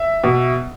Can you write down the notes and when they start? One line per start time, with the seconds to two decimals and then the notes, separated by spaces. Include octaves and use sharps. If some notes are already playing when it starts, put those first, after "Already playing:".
Already playing: E5
0.24 B2